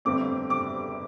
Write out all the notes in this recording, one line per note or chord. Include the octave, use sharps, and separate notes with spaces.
G1 F2 D3 A3 C4 D6
D6